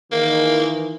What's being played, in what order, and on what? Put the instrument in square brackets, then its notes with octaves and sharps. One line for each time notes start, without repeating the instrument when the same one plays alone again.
[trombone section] D#3 E3 [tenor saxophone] A#3